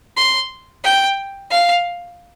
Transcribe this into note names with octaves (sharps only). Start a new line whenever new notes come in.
C6
G5
F5